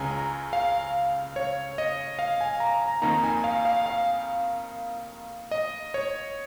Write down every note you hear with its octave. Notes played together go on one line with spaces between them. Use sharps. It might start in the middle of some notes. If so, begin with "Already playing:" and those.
Already playing: C#2 C#3 G#3 C#4 G#5 A#5
A#5
F5
C#5
D#5
F5
G#5
A#5
A#5
F2 D#3 A#3 D#4 A#5
G#5
F5
F5
F5
D#5
C#5